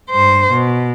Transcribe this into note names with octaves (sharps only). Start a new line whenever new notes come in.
G2 C5
B2